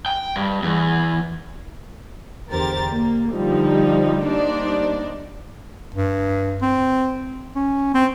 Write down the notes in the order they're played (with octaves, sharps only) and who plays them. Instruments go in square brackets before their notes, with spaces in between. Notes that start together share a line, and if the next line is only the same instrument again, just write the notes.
[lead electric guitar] G5
G2
E2
[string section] E2 D3 G4 A#4 C5 A6
A#3
D3 F3 G3 D#4
G3 A#3 D4 D#4 C5 D5
[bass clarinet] G2
C4
C#4
C4